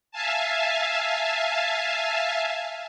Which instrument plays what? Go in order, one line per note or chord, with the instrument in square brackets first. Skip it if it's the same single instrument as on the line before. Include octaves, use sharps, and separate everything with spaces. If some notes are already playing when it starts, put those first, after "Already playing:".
[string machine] E5 F5 G#5 A5